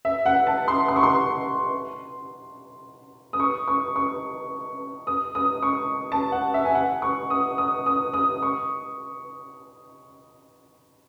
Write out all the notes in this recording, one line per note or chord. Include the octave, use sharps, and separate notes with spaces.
E5
F#5
A5
C6
C6
C#6
C6
D#6
C#6
C#6
C#6
D#6
D#6
C#6
A5
F#5
E5
G#5
F#5
C#6
D#6
D#6
D#6
D#6
C#6